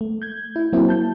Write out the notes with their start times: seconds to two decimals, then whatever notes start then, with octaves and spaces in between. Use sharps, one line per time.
0.01 A3
0.22 G6 G#6
0.56 E4
0.73 F#3 A#3 C4 E4
0.89 A5 G6